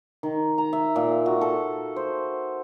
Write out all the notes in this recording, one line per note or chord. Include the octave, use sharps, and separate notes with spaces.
D#3
A#5
E5
A#2
F#4
A4
C5